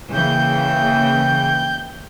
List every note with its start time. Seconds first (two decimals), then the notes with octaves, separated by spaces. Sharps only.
0.12 C#3 E3 A#3 G5 G6